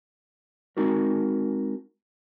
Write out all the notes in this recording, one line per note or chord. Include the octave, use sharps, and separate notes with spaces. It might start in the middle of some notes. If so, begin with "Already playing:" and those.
G#3 C4 D#4 F#4 A#4